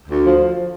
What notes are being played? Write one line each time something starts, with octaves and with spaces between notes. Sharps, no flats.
D2
F3